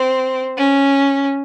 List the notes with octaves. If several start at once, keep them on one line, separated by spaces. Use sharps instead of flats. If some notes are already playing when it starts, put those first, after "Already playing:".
Already playing: C4
C#4